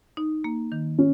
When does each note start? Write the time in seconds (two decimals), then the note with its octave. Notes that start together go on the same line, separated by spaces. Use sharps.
0.17 D#4
0.44 A#3
0.72 D#3
0.98 C#4